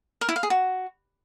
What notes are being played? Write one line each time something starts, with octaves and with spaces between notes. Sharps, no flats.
A#4
E4
F5
G#4
F#4